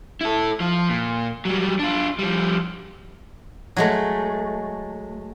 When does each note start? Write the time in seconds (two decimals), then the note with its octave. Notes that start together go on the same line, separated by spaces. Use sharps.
0.21 E4 A4
0.60 F3
0.90 A#2
1.45 F#3 G3
1.79 D4 F4
2.19 F3 G3
3.77 F#3 G#3 A3